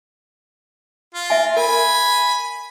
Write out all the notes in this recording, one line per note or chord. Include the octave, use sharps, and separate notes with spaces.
F4
E5 G#5
A#4 G#5 B5